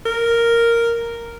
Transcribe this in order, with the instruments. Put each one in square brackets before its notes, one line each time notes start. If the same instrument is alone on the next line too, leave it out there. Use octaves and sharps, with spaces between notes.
[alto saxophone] A#4